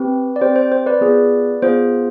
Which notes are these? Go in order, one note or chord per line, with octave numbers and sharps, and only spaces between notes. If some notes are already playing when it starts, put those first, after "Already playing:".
Already playing: C4 G4 B4
D5
C4 G4 C5
C5
C5
B4 D5
B3 F4 G#4
B3 F4 G#4 C5